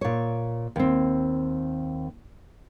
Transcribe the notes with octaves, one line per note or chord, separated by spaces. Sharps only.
A#2 C#5
D#2 C4